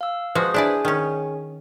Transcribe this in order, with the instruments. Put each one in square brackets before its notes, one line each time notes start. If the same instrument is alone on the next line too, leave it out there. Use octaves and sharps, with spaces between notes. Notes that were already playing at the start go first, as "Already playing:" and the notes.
[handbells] F5 E6
[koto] F3 G#3 F#4 [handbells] B4 C5 D#6
[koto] D4 E4 D5 [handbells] G#4 G#5
[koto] D#3 C#4